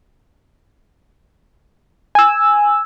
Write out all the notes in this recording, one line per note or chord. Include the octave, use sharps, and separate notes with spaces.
G#5 E6